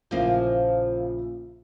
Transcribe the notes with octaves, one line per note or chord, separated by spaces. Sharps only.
A#1 C#3 F3 A#3 E4